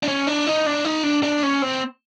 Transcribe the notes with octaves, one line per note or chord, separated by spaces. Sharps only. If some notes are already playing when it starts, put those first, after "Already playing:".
D4
C#4
D4
D#4
D4
D#4
D4
D4
C#4
C4